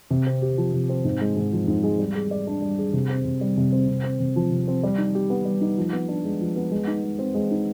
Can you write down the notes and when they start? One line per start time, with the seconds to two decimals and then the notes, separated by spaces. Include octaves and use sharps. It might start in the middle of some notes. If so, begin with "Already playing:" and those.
0.11 C3
0.27 C4
0.42 G4
0.58 F3
0.73 C3
0.89 C4
1.04 G#2
1.21 G#3
1.36 G#2
1.53 F3
1.68 G#2
1.83 G#3
1.99 G3
2.15 G#4
2.31 D5
2.47 D4
2.62 G3
2.78 G#4
2.93 C3
3.10 C4
3.25 C3
3.41 G3
3.57 C3
3.72 C4
3.88 C3
4.04 C4
4.20 C3
4.36 F3
4.51 C3
4.68 C4
4.83 G3
4.98 D#4
5.15 G4
5.30 B3
5.45 G3
5.61 D#4
5.78 F3
5.93 B3
6.08 D4
6.24 G#3
6.41 F3
6.56 B3
6.71 G#3
6.87 D#4
7.03 G#3
7.19 C4
7.34 G#3
7.51 D#4